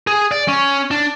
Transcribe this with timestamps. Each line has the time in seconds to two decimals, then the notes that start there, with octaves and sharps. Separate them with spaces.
0.07 G#4
0.31 D5
0.48 C#4
0.91 D4